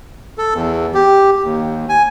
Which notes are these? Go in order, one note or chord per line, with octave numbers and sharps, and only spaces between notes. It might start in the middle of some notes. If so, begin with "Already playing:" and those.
A4
E2
G4
D#2
G#5